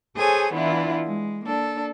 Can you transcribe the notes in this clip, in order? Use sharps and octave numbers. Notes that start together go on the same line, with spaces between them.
G#4 A4 C5 C#5 G#5
E3 B3 D4 E4 F4
G#3
A#3 D4 A4